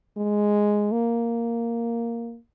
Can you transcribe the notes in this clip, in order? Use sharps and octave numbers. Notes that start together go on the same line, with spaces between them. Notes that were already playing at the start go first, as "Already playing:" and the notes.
G#3
A#3